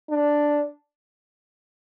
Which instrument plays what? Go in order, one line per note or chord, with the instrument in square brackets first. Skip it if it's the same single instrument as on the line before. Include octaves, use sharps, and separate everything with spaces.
[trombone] D4